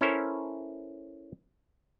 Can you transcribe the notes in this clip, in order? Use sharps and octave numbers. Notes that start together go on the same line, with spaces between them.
C#4 E4 A4 A#4 C5 C#5